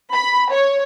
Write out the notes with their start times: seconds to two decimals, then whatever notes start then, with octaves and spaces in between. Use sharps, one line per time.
0.13 B5
0.51 C#5